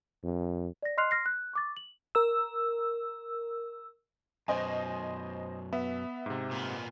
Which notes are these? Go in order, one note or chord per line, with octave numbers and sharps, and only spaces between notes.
F2
D5 A#6
D#5 C6 F6 F#6 C7 F7
C6 F6 A#6 C7
F#6
C#6 D6 A6
F#7
A#4 E6
F#2 B2 C5 D#5 G#5
B3 E5
G#2 C3
A#2 B3